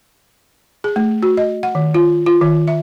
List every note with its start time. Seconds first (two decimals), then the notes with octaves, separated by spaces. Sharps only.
0.84 G#4
0.96 A3
1.23 F#4
1.37 D#5
1.63 F#5
1.75 D#3
1.94 F4
2.26 F4
2.41 D#3
2.68 E5